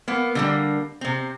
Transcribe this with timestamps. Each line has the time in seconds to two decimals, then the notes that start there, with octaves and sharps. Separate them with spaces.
0.08 A#3 B3
0.35 D3 G3 A#3
1.01 C3 C4